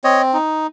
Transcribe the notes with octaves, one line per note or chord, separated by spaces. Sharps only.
C4 C#5 D#5
D#4